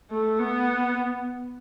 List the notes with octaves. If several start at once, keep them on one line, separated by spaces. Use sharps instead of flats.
A3
B3